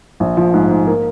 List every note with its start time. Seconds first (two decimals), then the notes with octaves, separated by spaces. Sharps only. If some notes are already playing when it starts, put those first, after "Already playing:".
0.20 A#1
0.37 F3
0.54 G#2
0.71 G#2
0.87 A#3